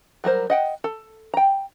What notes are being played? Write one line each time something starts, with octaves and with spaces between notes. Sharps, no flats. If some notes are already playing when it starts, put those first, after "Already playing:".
F#3 G3 A#4 C5
D#5 F#5 G5
A4
G5 A#5